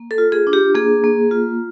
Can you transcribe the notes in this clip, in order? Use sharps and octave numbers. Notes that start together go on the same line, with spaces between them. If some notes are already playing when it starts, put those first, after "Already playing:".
Already playing: A#3
A4
F4
G#4
D4
G4
A#3 G#4
A#3
F4